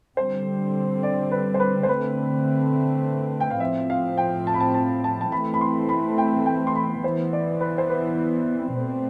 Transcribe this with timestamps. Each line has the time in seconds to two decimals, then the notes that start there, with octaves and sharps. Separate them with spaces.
0.17 D3 G3 C4 C5
1.03 D5
1.32 B4
1.54 C5
1.60 B4
1.83 C5
1.89 D3 A3 C4 B4
3.40 G5
3.50 F5
3.60 A2 F3 C4 E5
3.90 F5
4.18 G5
4.47 A5
4.54 B5
4.60 A5
4.74 A5
5.04 A5
5.21 A5
5.32 E3 A3 C4 B5
5.54 B5
5.61 C6
5.89 B5
6.18 G5
6.46 G5
6.67 C6
6.75 B5
7.04 E3 B3 C5
7.33 D5
7.61 B4
7.78 C5
7.90 B4
8.75 B2 A3 C4